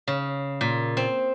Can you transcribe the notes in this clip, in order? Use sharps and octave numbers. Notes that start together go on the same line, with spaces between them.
C#3
A#2
C4